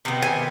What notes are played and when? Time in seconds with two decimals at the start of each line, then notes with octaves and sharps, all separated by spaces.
0.05 C3 D#3 B3
0.22 G#5